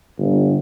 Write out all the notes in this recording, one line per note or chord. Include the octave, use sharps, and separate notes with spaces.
G1